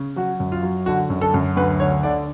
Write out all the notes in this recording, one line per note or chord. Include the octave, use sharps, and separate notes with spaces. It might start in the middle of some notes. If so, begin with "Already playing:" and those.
Already playing: C#3
F#3 F#4
F#2
F4
F#3
D3 F#4
F#2
A4
F#2
D2 B4
D3 C#5
D3 D5